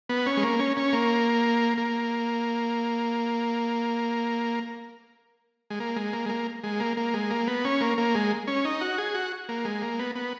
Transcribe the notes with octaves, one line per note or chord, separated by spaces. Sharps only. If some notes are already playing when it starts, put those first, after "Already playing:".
B3
C#4
G#3
A#3
C#4
C#4
A#3
A#3
G#3
A#3
G#3
A#3
G#3
A#3
G#3
A#3
A#3
G#3
A#3
B3
C#4
A#3
A#3
G#3
C#4
D#4
F#4
G#4
F#4
A#3
G#3
A#3
B3
B3